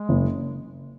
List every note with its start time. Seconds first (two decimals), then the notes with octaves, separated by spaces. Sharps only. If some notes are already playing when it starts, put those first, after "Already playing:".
Already playing: G#3
0.09 F#1